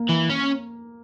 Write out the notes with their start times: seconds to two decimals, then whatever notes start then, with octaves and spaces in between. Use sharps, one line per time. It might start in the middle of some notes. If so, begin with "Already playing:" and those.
Already playing: A#3
0.09 E3
0.30 C#4